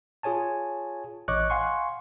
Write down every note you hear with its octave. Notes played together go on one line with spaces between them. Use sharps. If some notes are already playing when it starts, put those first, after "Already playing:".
F4 G#4 C#5 G#5 A5
A1 C#5 D#5 C#6 D6 F#6
F5 F#5 G#5 C6 C#6